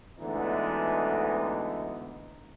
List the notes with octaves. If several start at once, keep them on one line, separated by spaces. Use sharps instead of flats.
D2 D3 E3 G#3 B3 D#4